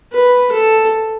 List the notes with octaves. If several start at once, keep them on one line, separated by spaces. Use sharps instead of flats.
B4
A4